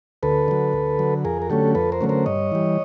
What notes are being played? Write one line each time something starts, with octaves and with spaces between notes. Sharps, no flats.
D2 A4 B4
D3 F#3
D2
D3 F#3
F2 G#4 A#4
A#4
D3 F#3 A3 C#4 G4 A4
F2 A4 B4
A#4 C5
D3 F#3 A3 C#4
A#4 C5
G2 C#5 D#5
E3 G3